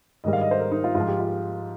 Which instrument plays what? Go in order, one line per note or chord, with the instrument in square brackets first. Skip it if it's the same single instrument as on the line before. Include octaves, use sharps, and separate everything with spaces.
[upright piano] G#2 D#3 G3 D#5
F5
D#5
C5
A#4
D#4
F4
G#2 F3 F4
G4
F4